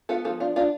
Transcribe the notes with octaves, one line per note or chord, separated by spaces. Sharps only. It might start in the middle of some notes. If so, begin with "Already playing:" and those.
B3 F4 A4
F3 F4 A4
D4 F4
D4 F4